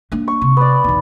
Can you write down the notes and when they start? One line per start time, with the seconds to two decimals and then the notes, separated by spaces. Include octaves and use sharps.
0.12 A#3 D4
0.28 C#6
0.42 C3
0.57 B3 D5
0.84 B1 E2